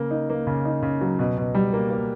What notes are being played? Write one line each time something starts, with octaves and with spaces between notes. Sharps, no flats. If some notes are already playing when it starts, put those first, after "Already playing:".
Already playing: C#3 A#3
D#4
A#3
C#3
D#4
C#3
F#3
B2
B2
G3
A#3
A#3